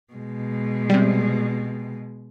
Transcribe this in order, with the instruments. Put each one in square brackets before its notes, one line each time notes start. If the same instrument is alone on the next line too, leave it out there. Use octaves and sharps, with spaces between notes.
[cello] B2 G#3
[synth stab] C3 G3